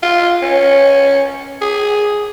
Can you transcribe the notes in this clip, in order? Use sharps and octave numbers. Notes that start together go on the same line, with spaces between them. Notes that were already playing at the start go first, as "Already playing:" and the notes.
F4
C#4
G#4